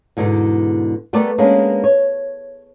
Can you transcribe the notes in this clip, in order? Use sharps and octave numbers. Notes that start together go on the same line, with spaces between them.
E2 G#2 B2 D3
G3 A3 B3 A4 A#4 D5
G#3 A#3 B3 C#4 D4
C#5